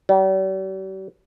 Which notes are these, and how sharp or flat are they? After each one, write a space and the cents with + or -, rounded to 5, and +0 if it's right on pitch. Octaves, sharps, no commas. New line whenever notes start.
G3 -45